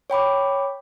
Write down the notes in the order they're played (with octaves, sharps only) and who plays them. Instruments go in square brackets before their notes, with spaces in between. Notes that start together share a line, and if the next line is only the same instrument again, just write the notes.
[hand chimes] C#5 G5 B5 D6